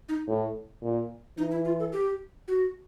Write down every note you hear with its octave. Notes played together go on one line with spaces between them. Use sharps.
D#4
A2
A#2
E3 D#4
E4
F4
A4
G4
F#4